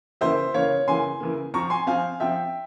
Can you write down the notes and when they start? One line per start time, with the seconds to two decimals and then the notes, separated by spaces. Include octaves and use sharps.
0.21 C#3 E3 A#3 C5 E5
0.54 C#3 E3 A#3 C#5 F5
0.88 C#3 E3 A#3 G#5 C6
1.20 C#3 E3 A#3
1.54 F3 C4 A#5 C#6
1.70 G#5 C6
1.87 F3 C4 F5 G#5
2.20 F3 C4 E5 G5